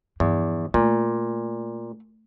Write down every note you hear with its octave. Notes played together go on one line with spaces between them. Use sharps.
E2 G2 F3
A#2 A3